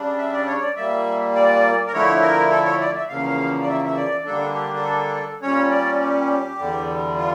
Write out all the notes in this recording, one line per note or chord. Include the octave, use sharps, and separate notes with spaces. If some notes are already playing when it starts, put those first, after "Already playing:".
Already playing: C#3 G3 D4
E5
D5
C#5
D5
A#2 G3 A#3 E5
D5
A#4
D3 F3 A3 E4 C#5
A#4
A4
C#5
D5
E5
E2 C#3 F3 A#3 F5
D5
E5
E5
D5
D3 G3 A#3 D4 A4
G4
G4
A4
A#2 G3 C#4 C#5
D5
G4
E2 D3 G3
F4